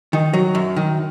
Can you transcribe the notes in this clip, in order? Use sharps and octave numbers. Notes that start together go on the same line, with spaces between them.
D#3
F#3
F#2
D#3